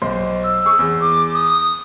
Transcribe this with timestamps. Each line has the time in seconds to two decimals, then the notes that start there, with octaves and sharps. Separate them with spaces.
0.02 B1 C5 C6
0.44 E6
0.66 G#4 C#6
0.79 E2
1.01 D6
1.35 D#6